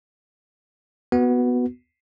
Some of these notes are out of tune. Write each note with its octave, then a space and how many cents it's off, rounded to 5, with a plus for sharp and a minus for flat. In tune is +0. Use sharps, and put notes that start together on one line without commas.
B3 +0 F#4 +0